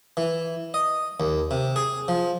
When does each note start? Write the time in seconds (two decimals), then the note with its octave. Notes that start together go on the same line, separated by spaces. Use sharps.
0.17 E3
0.74 D#5
1.20 D#2
1.51 C3
1.76 G#4
2.08 F3